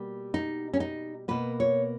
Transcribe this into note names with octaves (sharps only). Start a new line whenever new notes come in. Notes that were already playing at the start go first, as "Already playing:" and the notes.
Already playing: B2 G3 A#3
D#4
C#4
D#4
B2 A#3 B4
C#5